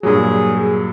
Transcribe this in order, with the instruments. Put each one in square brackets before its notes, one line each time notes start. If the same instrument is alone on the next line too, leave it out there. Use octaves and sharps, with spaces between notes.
[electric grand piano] G2 A#2 F#3 [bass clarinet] G#4